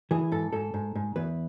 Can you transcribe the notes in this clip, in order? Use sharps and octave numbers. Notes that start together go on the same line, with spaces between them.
E3 G#4
G#2 A4
G#2 A4
G#2
G#2
E2 B4